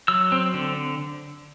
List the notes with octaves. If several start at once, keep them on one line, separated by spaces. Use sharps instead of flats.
F#3 E6
C4
D3